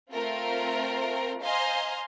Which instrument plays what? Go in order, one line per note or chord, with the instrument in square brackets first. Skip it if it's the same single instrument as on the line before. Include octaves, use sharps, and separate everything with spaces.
[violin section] A3 C4 F4 A#4
C5 D#5 F5 G#5 A#5 C6